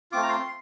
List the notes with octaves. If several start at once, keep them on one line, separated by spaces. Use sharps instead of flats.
A3 C4 F4 D6
A#5
C6